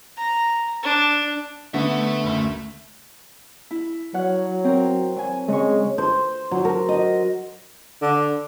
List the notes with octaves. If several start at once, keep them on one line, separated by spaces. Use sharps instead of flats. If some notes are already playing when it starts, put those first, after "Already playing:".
A#5
D4
D3 A3 B3 E5
F#1 D2
E4
F#3 C#5 F#5 F6
C4 A#4
F#3 G#5
C#3 G#3 C#6
C5
F#3
A#4
D#5
D3